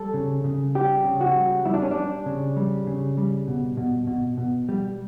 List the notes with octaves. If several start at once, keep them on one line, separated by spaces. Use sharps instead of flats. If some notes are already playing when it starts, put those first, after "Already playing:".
Already playing: G3 A4
C#3
C#3
G3 G4
C#3
F#4
G3
G3 E4
D4
C#4
D4
G3
C#3
G3
C#3
G3
B2
B2
B2
B2
G3